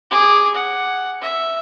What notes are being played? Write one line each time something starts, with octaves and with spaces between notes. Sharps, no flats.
G#4 D6
F#5
E5